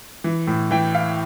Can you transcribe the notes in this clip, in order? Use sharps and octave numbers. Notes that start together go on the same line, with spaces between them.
E3
A2
E3 G5
E4 F5